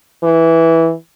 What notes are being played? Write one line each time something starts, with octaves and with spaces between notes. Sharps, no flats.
E3